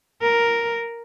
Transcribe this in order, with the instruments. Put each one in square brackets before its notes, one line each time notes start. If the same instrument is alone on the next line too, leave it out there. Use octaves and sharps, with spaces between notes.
[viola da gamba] A#4